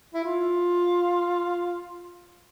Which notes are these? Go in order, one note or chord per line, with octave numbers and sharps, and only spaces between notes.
E4
F4